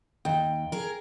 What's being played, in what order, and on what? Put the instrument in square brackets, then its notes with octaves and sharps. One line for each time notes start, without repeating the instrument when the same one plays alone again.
[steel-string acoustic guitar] D#2 [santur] G5
[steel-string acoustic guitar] G#4 A#4